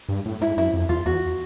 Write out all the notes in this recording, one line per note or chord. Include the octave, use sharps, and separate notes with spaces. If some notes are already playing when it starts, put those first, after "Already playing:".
G2
A2
G#2 E4
F#2 E4
F2
E2 F4
E2 F#4